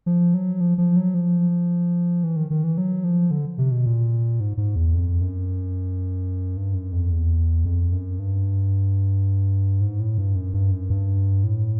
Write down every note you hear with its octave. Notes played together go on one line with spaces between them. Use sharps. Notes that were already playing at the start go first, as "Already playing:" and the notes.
F3
F#3
F3
F3
F#3
F3
E3
D#3
D#3
E3
F#3
F3
D3
C3
B2
A#2
G#2
G#2
E2
F2
F#2
G2
F#2
F2
E2
F2
F#2
G2
G#2
A2
G2
F#2
G2
F#2
G2
A2